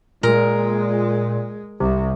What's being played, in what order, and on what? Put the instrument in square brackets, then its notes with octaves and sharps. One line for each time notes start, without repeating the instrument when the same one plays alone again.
[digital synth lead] A#2 [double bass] G#3 [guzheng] A#4
[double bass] C2 [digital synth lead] C3